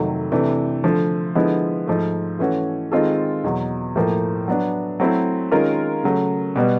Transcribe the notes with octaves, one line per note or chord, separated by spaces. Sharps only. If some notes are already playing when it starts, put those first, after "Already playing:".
Already playing: F2 C3 D#3 F#3 A3
C3 E3 A3 D4
D3 F3 A3
D3 F3 G#3 B3 E4
G#2 F3 A3
E3 A3 C#4 F#4
D#3 G#3 C4 F4 A4
E2 B2 F#3
A2 F3 A#3
F#3 B3 D4
F#3 A3 C4 E4 A4
D#3 G#3 C#4 F4 A#4
C#3 F#3 A3
B2 G3 B3